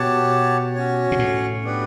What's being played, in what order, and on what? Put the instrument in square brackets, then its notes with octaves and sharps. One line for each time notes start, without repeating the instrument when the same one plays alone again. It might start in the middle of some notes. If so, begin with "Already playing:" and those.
Already playing: [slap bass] B2 [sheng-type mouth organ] G4 C#5 F#5 A5
[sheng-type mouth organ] C#4 F#4 C#5
[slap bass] B2
A2
[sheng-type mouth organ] B3 D4 G4 B4